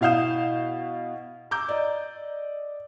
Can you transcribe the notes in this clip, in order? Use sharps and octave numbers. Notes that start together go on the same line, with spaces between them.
B2 E4 F5 D#6 G6 E7
A#5 D6 E6 G6
D5 D#5